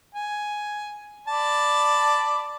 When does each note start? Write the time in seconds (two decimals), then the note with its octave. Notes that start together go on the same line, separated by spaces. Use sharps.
0.15 G#5
1.28 D5 A5 B5